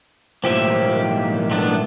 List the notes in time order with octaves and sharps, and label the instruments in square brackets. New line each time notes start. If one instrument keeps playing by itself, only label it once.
[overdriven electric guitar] B1 A2 [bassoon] F3 [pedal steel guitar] A#3 G4 E5
[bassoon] D#3
[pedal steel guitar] A3 B3 D4